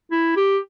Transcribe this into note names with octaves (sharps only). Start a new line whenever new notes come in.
E4
G4